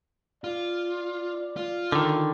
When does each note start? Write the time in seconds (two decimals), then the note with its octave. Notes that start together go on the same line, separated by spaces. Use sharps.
0.44 F4 D5
1.57 F4
1.92 D3 D#3